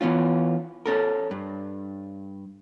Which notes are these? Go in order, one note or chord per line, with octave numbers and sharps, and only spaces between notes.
E3 B3 C#4 F4
C#4 A4 A#4
G2